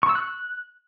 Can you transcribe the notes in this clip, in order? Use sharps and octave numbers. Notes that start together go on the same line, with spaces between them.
C#6
E6
F#6